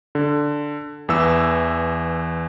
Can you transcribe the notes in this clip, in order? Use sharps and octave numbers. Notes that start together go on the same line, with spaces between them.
D3
E2 E3 E6